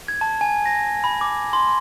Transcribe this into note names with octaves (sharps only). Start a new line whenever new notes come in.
G#6
A5
G#5
A#6
B5
D6
C6